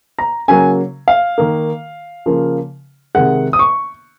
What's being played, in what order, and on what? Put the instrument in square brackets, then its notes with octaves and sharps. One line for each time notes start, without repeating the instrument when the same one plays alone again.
[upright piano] A#5
C#3 F#3 A#3 G#5
F5
D#3 A#3
C#3 F3 A#3
C3 D#3 G#3 F#5
D#6
C#6